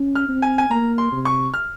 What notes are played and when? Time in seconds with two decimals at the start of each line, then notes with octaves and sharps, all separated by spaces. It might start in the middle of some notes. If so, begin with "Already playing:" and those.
Already playing: C#4
0.15 F6
0.29 C4
0.42 G#5
0.58 G#5
0.70 A#3 A#5
0.98 C6
1.12 C3
1.25 C#6
1.54 F6